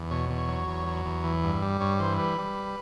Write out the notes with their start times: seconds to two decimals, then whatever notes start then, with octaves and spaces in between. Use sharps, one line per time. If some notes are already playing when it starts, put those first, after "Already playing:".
Already playing: E2
0.11 B2 C#5
0.30 E2
0.38 C#5
0.48 F#3
0.67 E2
0.87 F#3
1.05 E2
1.24 E3
1.44 G2
1.62 G3
1.80 G2 C#5
1.99 E3 C5
2.18 G3 B4
2.38 G3